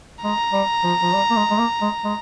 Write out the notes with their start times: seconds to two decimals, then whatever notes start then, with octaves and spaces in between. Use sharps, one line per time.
0.23 G#3 A#5
0.53 G3
0.84 F3
1.02 F3
1.14 G3
1.30 A#3
1.36 G#3
1.51 G#3
1.58 A#3
1.82 G#3
2.05 G#3